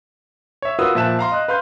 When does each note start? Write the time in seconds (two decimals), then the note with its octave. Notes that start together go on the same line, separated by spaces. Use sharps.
0.62 C#5 E5
0.79 F4 F#4 A#4 B4 D#6 E6
0.95 A#2 F3 E5 A5 F#6 E7
1.19 F5 A#5 C6
1.32 D#5 F#6
1.48 B4 F5 C6 G6